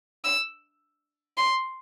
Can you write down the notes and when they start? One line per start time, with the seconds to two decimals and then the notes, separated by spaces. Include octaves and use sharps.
0.24 E6
1.37 C6